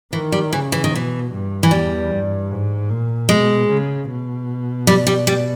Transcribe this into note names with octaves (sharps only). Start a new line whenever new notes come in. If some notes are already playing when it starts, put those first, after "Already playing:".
D#3 E3
G3
C#3 E3
E3
D#3
B2 E3
G2
E3
E2 G3
G2
G#2
A#2
B2 G#3
C#3
B2
G3
G3
G3